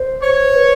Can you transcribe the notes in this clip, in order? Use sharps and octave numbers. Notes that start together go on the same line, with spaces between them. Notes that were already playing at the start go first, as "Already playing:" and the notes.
Already playing: C5
C#5
C5
B4